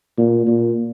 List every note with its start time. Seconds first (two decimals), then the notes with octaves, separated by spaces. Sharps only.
0.18 A#2
0.47 A#2